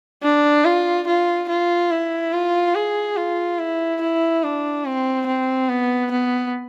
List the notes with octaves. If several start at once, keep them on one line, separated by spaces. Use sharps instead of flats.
D4
F4
F4
F4
E4
F4
G#4
F4
E4
E4
D4
C4
C4
B3
B3